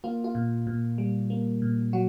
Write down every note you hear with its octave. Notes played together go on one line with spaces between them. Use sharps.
A#3 F4
F4
A#2
A#2
G3
A#3
A#2
F#3 F#4